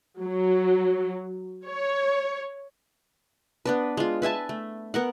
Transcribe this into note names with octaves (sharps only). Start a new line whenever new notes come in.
F#3
C#5
B3 D4 B4
G#3 F4
B4 E5 G#5 A5
A3
B3 A#4 F#5